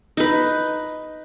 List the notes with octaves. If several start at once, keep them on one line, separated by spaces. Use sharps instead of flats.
D#4 B4